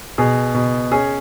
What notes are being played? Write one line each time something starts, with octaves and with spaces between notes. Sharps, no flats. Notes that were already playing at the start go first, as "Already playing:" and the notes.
B2 G#4
B2
C#4 G#4